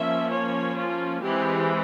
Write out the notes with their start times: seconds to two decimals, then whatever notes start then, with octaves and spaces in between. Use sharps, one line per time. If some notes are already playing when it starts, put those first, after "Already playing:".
Already playing: F3 A#3 C#4 E5
0.31 C#5
0.76 F4
1.22 E3 G#3 C4 G4